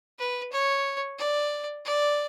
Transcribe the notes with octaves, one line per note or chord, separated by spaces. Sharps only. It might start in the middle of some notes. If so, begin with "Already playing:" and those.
B4
C#5
D5
D5